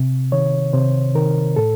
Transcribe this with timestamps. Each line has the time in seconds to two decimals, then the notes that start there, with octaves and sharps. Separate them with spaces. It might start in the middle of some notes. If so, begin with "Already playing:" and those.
Already playing: C3
0.32 D#3 C#5
0.73 C3 C5
1.15 D#3 A#4
1.56 A2 A4